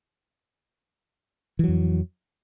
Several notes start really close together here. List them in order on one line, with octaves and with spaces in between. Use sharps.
E3 F#3 F2